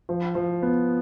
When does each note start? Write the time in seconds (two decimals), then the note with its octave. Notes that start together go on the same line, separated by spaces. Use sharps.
0.09 F3
0.35 F3
0.62 B3